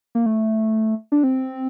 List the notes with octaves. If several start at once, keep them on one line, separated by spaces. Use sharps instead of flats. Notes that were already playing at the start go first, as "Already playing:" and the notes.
A#3
A3
D4
C4